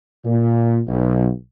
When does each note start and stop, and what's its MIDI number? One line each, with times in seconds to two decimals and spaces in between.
0.25 0.80 46
0.87 1.29 35